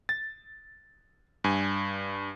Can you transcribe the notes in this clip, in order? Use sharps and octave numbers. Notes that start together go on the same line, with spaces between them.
A6
G2 G#5